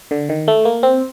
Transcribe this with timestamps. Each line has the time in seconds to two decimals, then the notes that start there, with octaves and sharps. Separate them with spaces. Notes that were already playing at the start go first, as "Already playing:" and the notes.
0.11 D3
0.29 D#3
0.48 A3
0.65 A#3
0.83 C4